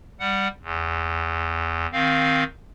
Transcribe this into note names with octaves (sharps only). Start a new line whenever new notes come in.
G3 F#5
E2
D#3 C4 F5